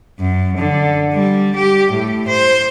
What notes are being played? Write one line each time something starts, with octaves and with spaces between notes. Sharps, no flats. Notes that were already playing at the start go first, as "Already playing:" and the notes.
F#2
D3
G3
G4
A2
C5